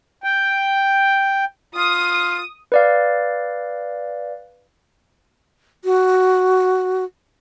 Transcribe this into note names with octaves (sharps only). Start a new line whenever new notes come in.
G5
F4 D#6
B4 D5 F5
F#4